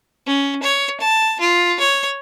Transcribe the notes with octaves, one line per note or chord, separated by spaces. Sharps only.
C#4
C#5
A5
F4
C#5